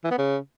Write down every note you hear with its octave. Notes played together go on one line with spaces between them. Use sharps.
E3
B3
C#3